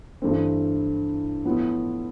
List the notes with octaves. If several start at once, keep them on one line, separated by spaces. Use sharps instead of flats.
G2 E3 A3 C4
A2 F3 B3